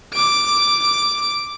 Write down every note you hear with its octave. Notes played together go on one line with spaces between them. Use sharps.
D6 D7